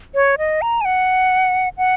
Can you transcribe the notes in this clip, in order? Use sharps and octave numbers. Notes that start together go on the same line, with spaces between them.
C#5
D#5
A#5
G#5
F#5
F#5